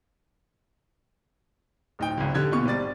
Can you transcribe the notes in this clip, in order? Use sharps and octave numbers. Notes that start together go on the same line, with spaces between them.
D1 D#4 G5
G#1 C#2
D3 G4 G#6
B1 A#2 B3 C#6
G#1 G3 D5 A6